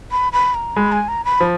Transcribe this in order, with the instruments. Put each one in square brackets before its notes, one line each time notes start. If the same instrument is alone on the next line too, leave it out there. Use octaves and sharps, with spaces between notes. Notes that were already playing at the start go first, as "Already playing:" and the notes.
[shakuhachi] B5
B5
A#5
[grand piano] G#3 [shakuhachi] B5
[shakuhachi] G#5
A#5
B5
[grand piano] F3